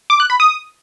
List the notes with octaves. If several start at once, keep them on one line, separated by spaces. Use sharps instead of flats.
D6
F#6
B5
D#6